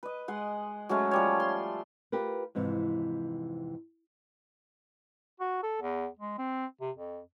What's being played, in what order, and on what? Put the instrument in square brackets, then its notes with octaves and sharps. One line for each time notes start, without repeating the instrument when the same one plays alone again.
[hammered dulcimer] B4 D#5
G#3 F#5 C6
F#3 G#3 A3 C#4
F3 G3 C#5
C6
[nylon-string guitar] F4 G4 A#4 B4
F2 G#2 C3 E3
[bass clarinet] F#4
A4
E2
G#3
C4
C3
F2